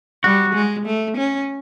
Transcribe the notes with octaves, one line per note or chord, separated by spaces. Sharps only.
G3 F#4
G#3
A3
C#4